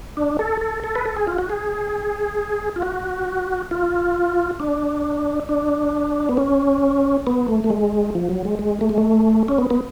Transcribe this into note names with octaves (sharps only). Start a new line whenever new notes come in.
D4
A4
A4
A4
B4
A4
G#4
F4
F#4
G#4
F4
F#4
F4
D4
D4
B3
C#4
B3
A3
A3
G#3
F3
F#3
G#3
G#3
A3
G#3
A3
C#4
B3
B3